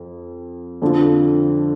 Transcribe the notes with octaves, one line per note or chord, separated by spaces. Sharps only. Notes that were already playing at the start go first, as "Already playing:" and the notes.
Already playing: F2
F2 D3 F3